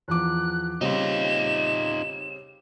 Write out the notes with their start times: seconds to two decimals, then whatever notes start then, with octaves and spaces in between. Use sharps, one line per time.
0.08 E2 F3 D6 F#6
0.81 C#3 G3 C4 D#4 F4 E7